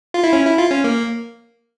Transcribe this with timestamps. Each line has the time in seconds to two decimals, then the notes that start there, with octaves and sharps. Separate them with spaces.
0.14 F4
0.24 E4
0.33 C#4
0.45 E4
0.58 F4
0.70 C#4
0.84 A#3